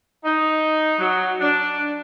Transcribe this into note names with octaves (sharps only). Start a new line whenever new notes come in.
D#4
F#3
D4